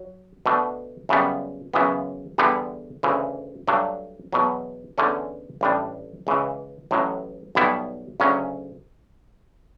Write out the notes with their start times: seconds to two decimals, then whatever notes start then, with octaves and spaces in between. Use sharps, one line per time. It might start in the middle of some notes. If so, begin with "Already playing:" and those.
Already playing: F#3
0.46 B2 A3 D4
1.09 F#2 C#3 G3 B3
1.74 F#2 C#3 E3 B3
2.38 E2 D3 G3 B3
3.03 D2 C#3 E3
3.68 G2 F#3 A3 D4
4.33 E2 B2 F#3
4.98 E2 D3 A3 C#4
5.61 A1 A2 G3 D4
6.27 C#2 C#3 E3
6.91 A1 A2 F#3
7.55 B1 B2 G3 B3 E4
8.20 D2 C#3 F#3 C#4